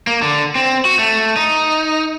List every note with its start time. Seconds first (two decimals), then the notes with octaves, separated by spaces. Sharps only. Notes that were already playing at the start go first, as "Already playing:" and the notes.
0.07 A#3
0.22 D3
0.56 C4
0.85 F#4
0.99 A3
1.36 D#4